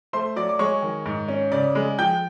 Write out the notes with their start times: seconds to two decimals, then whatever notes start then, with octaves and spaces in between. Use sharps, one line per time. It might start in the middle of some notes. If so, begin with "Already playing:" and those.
0.13 A3 C5 C6
0.36 F#3 D5 D6
0.49 D6
0.59 G#3 C#5 C#6
0.82 D#3
1.06 G#2
1.28 C#4
1.52 C#3 D5 D6
1.75 G#3
1.99 F3 G5 G6